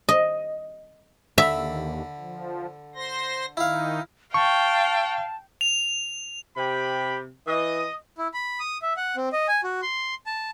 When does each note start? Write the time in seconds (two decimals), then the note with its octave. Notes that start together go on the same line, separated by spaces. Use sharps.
0.09 D#5
1.38 D#2 D3 E5 B5
2.19 F3
2.95 C5 C6 A#6
3.57 D#3 D#4 E4 F5
4.34 F5 G5 A5 C#6
5.61 F7
6.57 C3 G4 G5 B5
7.47 E3 D#5 D#6
8.18 E4
8.34 B5
8.60 D#6
8.82 E5
8.97 F#5
9.17 C4
9.33 D#5
9.48 G#5
9.64 F#4
9.82 C6
10.26 A5